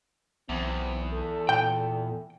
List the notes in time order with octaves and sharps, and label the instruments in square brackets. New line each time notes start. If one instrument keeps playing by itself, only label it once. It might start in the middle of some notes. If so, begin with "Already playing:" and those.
[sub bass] B1 [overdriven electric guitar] E2 [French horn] C4
[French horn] A4
[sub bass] A#2 [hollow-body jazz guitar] G5